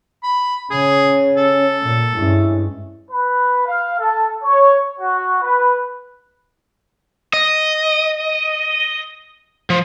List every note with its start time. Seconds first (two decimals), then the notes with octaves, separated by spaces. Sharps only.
0.23 B5
0.71 C#3 C#4 G#4
1.37 A4
1.84 A#2
2.16 G2 G#3 C#4 E4
3.11 B4
3.65 F5
4.00 A4
4.43 C#5
5.00 F#4
5.42 B4
7.33 D#5
9.70 F3